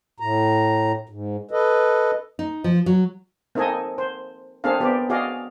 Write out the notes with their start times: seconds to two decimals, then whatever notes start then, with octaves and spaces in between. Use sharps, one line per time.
0.20 A2 A#5
1.09 G#2
1.51 A4 B4 D#5
2.39 D#4
2.64 F3
2.86 F#3
3.55 A#3 C4 D#4 A4 D#5 G#5
3.98 C5
4.64 A#3 C4 D4 G#4 A4 F5
4.80 B3 G4 C5 D5
5.10 F#4 G#4 D5 D#5 F5